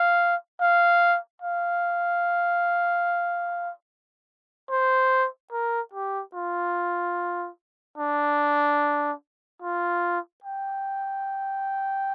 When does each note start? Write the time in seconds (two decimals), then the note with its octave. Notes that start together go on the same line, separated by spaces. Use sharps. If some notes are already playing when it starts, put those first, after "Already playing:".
Already playing: F5
0.60 F5
1.42 F5
4.70 C5
5.52 A#4
5.93 G4
6.34 F4
7.98 D4
9.62 F4
10.44 G5